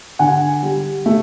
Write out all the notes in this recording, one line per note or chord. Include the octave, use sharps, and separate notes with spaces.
D3 F#5 G#5
G3
A3